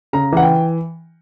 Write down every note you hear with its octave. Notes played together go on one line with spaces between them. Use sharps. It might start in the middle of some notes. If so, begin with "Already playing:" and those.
C#3 A#5
E3 F#5
G5